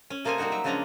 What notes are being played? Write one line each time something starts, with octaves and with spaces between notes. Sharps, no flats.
C#4
C3 A#3 A4 C5 D#5 G#5
G3 A#3 D#4 F#4 F#5
F#3 E5
C#3 F3 G#3 C#4 D4 A#5